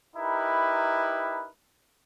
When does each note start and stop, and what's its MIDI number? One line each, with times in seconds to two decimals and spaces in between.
0.16 1.48 63
0.16 1.48 64
0.16 1.48 67
0.16 1.48 70
0.16 1.48 71